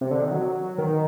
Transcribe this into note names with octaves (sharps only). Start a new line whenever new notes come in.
C3
D3
D#3
F#3
D#3